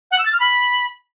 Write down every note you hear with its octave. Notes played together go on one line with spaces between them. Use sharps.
F#5
E6
A6
F6
B5